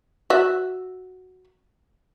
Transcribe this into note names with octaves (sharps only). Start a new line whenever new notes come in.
F#4 E5